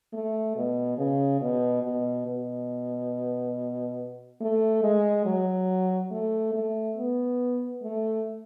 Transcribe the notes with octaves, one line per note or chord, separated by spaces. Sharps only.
A3
B2
C#3
B2
B2
B2
A3
G#3
F#3
A3
A3
B3
A3